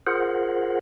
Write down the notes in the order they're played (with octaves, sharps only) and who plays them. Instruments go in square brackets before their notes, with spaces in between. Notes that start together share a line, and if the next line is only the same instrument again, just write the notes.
[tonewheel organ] F4 G#4 A#4 C5 F#5